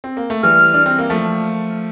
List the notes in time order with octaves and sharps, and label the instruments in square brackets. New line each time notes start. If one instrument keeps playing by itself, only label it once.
[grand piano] C4
A#3
A3
[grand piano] E3 G3 [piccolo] F6
[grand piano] D4
C4
A#3
F3 A3